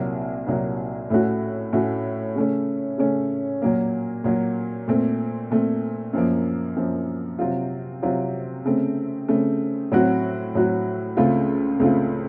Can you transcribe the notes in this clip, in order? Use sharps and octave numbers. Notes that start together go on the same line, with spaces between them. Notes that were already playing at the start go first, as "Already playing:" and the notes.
Already playing: C2 A#2 F#3 A#3
C2 A#2 F#3 A#3
A2 A3 C#4 F#4
A2 A3 C#4 F#4
C#3 A3 C#4
C#3 A3 C#4
A#2 F#3 A#3
A#2 F#3 A#3
A#2 A3 C4
A#2 A3 C4
F#2 F3 A#3
F#2 F3 A#3
C3 F#3 C4 F4
C3 F#3 C4 F4
C#3 A3 C4
C#3 A3 C4
A2 F#3 C4 F#4
A2 F#3 C4 F#4
C#2 C#3 A3 C4 F4
C#2 C#3 A3 C4 F4